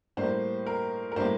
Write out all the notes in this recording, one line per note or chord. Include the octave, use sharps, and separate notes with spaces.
A2 G3 A#3 C5
A#4
A#4
A2 G3 A#3 C5